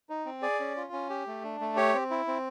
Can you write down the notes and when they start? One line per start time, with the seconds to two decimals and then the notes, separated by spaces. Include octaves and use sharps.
0.10 D#4
0.26 C4
0.42 G#4 D5
0.60 C#4
0.77 F4
0.93 C#4
1.10 G4
1.27 A3
1.44 D4
1.60 A3
1.76 G4 C#5
1.94 C4
2.10 E4
2.28 C4